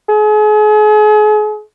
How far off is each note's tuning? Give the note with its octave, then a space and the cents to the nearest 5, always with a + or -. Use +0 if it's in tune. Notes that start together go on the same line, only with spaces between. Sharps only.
G#4 +40